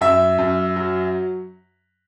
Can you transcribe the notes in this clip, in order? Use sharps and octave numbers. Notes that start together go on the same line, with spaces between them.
F#2 E5
F#2
F#3